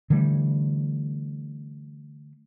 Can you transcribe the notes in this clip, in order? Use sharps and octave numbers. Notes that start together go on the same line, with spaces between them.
D3 E3 G3 A3